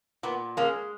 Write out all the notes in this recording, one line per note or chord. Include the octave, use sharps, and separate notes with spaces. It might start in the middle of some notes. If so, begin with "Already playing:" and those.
A#2 B3
G#3 A#3 C#4